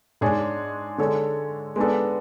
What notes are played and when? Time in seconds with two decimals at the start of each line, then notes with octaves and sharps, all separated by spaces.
0.21 G#2 G#3 D4 G#4 C#5
0.98 D3 G#3 D4 A4 C#5
1.76 G#3 B3 D4 A4